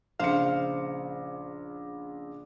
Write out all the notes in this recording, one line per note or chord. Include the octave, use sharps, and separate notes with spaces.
A#1 C#3 C5 F5 C#7